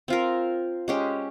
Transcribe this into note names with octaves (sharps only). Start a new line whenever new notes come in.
C4 F4 A#4
G#3 C#4 G4